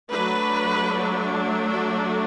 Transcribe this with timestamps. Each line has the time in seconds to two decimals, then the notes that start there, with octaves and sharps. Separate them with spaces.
0.10 F#3 A3 D4 B4
1.68 A4